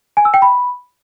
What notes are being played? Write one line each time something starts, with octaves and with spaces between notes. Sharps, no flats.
G#5
E6
G5
B5